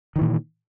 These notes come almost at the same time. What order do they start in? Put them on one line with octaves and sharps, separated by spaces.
D#3 E3 A#2